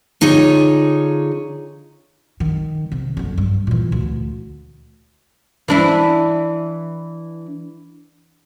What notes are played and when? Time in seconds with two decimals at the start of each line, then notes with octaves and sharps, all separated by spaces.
0.21 D3 D#4 F4 G#4 C#5
2.40 D#3
2.92 C3
3.17 F#1 D3
3.38 G2
3.67 A#2 E3
3.92 D2
5.68 E3 D4 E4